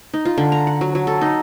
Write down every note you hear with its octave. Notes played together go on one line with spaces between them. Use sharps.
D#4
F4
D3
A#5
F#5
F#3
F#3
A4
D#4